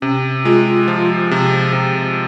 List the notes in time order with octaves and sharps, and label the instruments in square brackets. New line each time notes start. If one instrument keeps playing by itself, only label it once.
[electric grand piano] C3 [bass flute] C#4
[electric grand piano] G#3 [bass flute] F4
[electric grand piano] F3
C3
C3